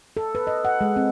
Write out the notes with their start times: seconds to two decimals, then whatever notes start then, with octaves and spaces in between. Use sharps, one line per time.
0.17 A4
0.35 B4
0.47 D#5
0.65 F#5
0.81 G#3
0.96 C4